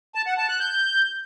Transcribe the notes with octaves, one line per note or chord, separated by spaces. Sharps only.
A5
F#5
A5
F#6
G6